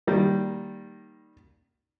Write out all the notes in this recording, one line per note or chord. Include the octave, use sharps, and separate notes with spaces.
D#3 G3 A#3